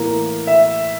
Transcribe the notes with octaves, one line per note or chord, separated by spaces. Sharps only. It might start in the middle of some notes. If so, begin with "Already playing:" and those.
Already playing: A2 E3 A#3 A#4
E5